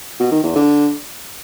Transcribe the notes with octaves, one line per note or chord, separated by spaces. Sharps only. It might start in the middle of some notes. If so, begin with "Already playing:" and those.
B2
D#3
E2
D3